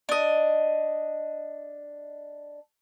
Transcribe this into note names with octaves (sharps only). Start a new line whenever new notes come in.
D4 D#5